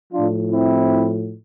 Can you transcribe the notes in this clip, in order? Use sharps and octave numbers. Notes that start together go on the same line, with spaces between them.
A2 F3 D4 F4
C4 E4